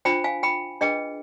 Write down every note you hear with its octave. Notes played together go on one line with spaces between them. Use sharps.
D4 F4 C5 G5 B5
F5 G#5
G5 B5
D4 G#4 B4 D#5 G5